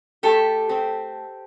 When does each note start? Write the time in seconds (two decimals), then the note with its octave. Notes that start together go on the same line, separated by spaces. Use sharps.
0.23 A3 G4 A4
0.69 C4